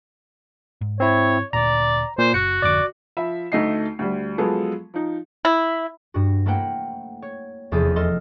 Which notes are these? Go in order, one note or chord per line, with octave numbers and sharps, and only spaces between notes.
G#2
C4 E4 C#5
D2 A#2 D3 D5 A#5
A#2 C5
F#1 F#4 C#7
G#1 F2 D3 D5 D6
F3 E5 B5
D2 A3 D#4 D#5 C7
D2 G3
F3 F#3 G#3 B3 G#4 A4
F3 D#4
E4
G2 F#4
A3 A#3 E4 C5 F#5 G5
C#5
F1 E2 F3 G#4 G6 A6
A4 D#5 C6 F6